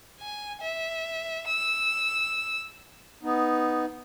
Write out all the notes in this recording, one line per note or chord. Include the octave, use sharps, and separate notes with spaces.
G#5
E5
E6
B3 D#4